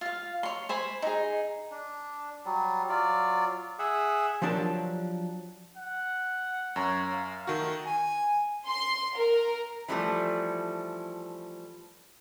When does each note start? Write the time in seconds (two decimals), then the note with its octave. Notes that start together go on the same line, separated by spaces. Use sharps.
0.01 F4 F5
0.43 C#5 C6
0.69 C5 G#5 B5
1.02 D#4 G#4
1.71 D4
2.45 F#3 G3
2.89 F#3 F4 D5
3.79 G#4 E5 F#5
4.42 F3 F#3 D4 G4 A#4
5.77 F#5
6.76 F#2 C#5 A#5
7.13 F5
7.47 D#3 A3 F#4
7.86 G#5
8.66 C6
9.15 A#4
9.88 E3 F3 G3 A3